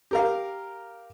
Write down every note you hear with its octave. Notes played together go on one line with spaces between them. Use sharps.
G4 A#4 F5